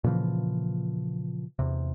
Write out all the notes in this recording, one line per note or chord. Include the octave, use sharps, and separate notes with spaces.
A#2 C#3 E3 F3
E2 C3